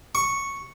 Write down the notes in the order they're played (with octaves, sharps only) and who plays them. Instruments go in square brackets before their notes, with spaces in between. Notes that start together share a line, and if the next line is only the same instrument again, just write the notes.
[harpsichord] C#6